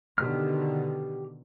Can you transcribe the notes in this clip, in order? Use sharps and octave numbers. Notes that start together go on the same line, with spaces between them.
B2 D3 D#3 G4 F6